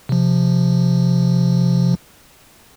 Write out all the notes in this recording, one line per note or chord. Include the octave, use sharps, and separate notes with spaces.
C3 F3